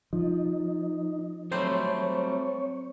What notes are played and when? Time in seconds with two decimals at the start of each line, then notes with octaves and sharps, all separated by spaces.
0.13 F3 D#4
1.52 F#3 G3 A3 C4 C5 C#5